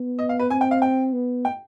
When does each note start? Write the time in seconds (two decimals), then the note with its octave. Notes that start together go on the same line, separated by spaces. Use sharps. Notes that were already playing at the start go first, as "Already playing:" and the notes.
Already playing: B3
0.19 D#5
0.29 F5
0.39 B4
0.50 C4 G#5
0.61 G5
0.71 F5
0.82 G5
1.13 B3
1.45 G5